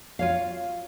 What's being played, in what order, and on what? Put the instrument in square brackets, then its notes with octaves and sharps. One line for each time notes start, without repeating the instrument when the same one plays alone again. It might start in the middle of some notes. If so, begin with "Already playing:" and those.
[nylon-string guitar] F4 C#5 F5